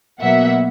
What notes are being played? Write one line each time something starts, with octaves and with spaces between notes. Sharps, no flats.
B2 F#3 A#3 E5 F#5